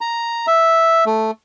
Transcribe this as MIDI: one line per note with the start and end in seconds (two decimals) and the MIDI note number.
0.01 0.46 82
0.47 1.04 76
1.06 1.31 57